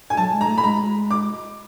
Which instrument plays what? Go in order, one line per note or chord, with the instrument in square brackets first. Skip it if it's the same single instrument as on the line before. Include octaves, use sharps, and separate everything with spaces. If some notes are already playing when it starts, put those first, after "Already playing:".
[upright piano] G#5
[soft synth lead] F#3 [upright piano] A5
[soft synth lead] G#3
[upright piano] A#5
[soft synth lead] A3
[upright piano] B5
[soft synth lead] G#3 [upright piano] A#5
[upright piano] D6